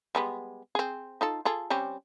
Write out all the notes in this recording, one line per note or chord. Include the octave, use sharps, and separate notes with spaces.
G3 G#3 B3
C4 G#4
D#4 F4 A4
F4 G#4 A4
G3 C4 C#4